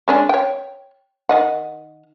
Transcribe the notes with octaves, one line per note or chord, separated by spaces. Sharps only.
G#3 C#4 D4
C#5 G5
D#3 D#5 F#5